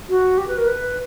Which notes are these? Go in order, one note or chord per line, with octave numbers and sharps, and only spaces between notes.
F#4
G4
B4
A#4
B4